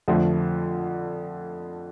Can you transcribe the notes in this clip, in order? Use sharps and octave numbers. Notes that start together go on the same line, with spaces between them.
F2 D3 F3 A3